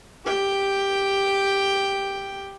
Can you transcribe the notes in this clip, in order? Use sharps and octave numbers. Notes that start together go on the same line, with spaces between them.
G4 G5